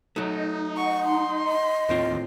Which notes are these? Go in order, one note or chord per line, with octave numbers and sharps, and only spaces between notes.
F#3 A3 D#4
F#5 C#6
C6
D#5
D#2 A2 C4 F4